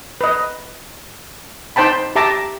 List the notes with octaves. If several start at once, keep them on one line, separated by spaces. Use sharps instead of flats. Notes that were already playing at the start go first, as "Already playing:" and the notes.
B4 D#5
D#4 C5 G5 A5 B5
G4 E5 A5 A#5 D6